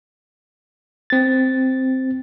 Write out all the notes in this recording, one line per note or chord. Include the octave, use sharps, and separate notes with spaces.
C4 A6